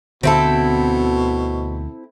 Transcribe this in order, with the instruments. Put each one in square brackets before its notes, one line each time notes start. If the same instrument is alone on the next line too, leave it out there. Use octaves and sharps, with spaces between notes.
[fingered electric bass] D2 D3 [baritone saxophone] B2 [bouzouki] C4 E4 A4